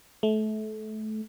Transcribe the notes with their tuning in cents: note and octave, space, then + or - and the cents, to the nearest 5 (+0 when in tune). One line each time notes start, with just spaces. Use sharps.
A3 -25